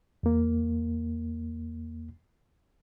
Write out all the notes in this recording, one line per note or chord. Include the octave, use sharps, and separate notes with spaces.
E2 A#3